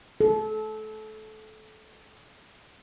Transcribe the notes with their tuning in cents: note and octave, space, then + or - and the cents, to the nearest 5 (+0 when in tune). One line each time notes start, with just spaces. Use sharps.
A4 -25